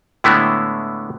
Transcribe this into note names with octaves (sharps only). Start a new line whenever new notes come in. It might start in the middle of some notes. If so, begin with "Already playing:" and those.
A2 D3 G#3 A3 B3 E4